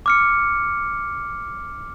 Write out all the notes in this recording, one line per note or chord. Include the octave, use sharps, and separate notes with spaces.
D6 F6 C#7